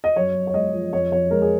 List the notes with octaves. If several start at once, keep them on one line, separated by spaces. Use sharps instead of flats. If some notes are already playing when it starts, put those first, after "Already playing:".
D#5
F#2 C#5
F#2
C#5
G#3 D#5
F3
F2 C#5
F2 C#5
G#3 A#4
G#4